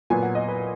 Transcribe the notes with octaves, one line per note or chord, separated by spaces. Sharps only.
A#2 F#3 B3 G#5
F#5
D#5
B4